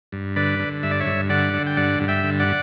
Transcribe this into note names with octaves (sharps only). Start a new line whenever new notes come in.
G2
D3 B4 D5
D3
G2 E5
D5
C#5 E5
G2
D3 D5 F#5
D3
G5
G2 D5 F#5
G2
E5 G5
D3
D5 F#5